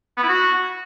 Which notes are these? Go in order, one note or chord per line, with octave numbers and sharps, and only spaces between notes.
B3
E4
F#4